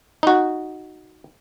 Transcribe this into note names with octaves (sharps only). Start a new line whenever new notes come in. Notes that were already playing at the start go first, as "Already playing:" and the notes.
D#4 F#4